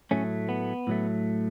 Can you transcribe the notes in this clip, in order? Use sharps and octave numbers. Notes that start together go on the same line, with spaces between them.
A2 F#3 A3 C#4
B3
A2 F#3 A3